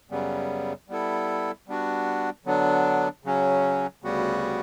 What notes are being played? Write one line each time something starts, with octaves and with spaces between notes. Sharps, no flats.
F#2 C#3 G3 B3
G3 B3 E4 A4
G3 B3 D4 F#4
D3 F#3 B3 D4
C#3 F#3 C#4
D2 C#3 G3 B3 F#4